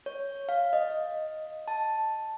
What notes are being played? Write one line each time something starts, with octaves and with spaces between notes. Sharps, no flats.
C#5
F5
D#5
A5